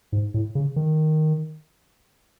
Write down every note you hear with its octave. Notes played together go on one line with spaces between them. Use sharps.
G#2
A2
C#3
D#3